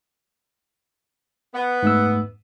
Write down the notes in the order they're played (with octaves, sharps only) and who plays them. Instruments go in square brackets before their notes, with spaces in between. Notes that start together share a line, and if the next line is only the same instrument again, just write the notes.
[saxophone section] B3
[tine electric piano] G#2 A3 E6